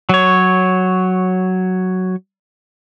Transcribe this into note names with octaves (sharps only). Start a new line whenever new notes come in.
F#3 C#5